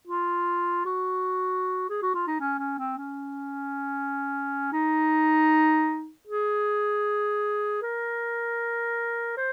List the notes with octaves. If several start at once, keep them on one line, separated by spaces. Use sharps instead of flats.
F4
F#4
G#4
F#4
F4
D#4
C#4
C#4
C4
C#4
D#4
G#4
A#4
C5